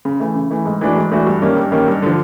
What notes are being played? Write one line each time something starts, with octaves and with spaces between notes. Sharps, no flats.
C#3
E3 A3
C#3
E3 A3
G#2
E3 A3 D4 F#4
G#2
E3 A3 D4 F#4
G2
D#3 G3 A#3 C#4
G2
D#3 G3 A#3 C#4
G2
D3 F3